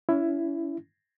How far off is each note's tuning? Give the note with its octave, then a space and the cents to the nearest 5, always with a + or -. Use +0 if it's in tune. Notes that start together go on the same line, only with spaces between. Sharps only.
C#4 +35 E4 +15